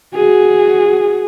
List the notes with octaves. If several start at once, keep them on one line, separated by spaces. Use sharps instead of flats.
F#4 G#4